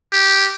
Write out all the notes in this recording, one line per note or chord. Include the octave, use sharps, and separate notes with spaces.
G4